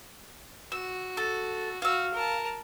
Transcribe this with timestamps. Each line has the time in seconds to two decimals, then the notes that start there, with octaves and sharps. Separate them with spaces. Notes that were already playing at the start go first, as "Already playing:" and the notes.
0.72 F#4 E6
1.17 A4
1.82 F#4 F5 E6
2.13 A#4 A5